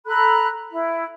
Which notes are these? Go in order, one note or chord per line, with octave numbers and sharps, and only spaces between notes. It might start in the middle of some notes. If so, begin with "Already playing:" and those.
A4 A#5 B5 F#6
E4